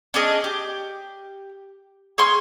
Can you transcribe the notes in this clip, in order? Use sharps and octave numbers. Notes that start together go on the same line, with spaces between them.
C#4 D4 G#4 D#5
G4
G#4 C#5 C6 F6